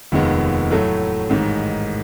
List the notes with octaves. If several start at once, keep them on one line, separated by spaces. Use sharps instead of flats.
F1 D#2 D#3 G#3 B3
A2 F#3 A3
A1 G#2 D#3